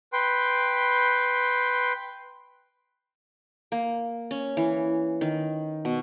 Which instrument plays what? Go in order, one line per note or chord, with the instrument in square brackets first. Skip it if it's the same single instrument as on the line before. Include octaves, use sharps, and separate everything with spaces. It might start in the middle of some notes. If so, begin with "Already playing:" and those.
[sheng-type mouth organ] B4 G5 C6
[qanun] A#3
C#4
E3
D#3
B2